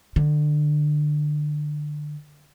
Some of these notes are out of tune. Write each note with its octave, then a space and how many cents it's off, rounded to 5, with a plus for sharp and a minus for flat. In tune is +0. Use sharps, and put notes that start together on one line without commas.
D3 +25